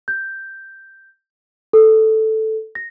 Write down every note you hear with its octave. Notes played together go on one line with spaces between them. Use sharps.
G6
A4
A#6